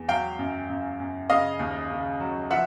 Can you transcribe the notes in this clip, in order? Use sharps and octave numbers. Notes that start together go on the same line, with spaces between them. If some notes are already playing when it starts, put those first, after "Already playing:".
Already playing: E2
F#3 F5 G5
F#2
F#2
F#2
C#3 D#5 F5
D#2
C#3
F#3
F3 E5 F#5